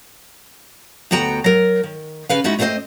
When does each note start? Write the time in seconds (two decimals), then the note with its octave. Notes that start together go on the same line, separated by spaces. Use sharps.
1.11 D2 B3 F#4 G5 A#5
1.44 F#3 A#4
1.83 D#3
2.29 C#3 B4 F5
2.44 G#3 D#4 E4 F#4 E5
2.59 A3 B3 C4 B4 C5 D#5